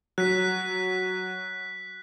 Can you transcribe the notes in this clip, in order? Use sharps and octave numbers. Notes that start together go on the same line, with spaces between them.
F#3 F#6 B6